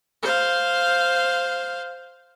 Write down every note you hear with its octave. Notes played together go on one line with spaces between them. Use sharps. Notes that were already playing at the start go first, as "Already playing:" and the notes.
C5 F5